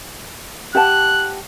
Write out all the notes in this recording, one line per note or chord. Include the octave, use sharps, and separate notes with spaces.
G4 F#5 A5 F#6